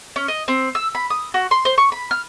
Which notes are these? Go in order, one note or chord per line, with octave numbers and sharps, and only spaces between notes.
C#4
D#5
C4
E6
B5
D#6
F#4
C6
C5
C#6
B5
F6